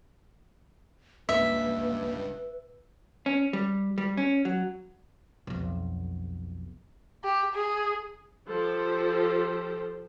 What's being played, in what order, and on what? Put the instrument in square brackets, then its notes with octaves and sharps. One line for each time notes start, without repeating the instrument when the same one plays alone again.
[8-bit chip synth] C#2 G2 [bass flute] A#3 [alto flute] B4 [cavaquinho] E5
[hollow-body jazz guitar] C#4
G3
G3
C#4
F#3
[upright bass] B1 F2
[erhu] G4
G#4
[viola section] F3 G4 A4 C5